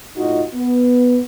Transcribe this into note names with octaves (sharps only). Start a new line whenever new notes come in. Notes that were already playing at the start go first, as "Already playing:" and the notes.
A2 D#4 F4 F#4 D#5
B3